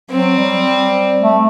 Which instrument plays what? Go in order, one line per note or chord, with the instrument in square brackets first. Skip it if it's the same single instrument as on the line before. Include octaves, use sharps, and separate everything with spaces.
[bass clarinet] F#3 [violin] C4
[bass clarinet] G3
A3